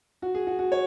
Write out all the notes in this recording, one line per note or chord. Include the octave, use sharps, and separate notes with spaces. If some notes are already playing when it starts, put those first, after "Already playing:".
F#4
G#4
F#4
F#4
C#5